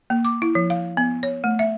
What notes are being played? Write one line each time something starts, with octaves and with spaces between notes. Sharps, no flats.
A#3
D6
E4
F3
F5
B3
C#5
A3
E5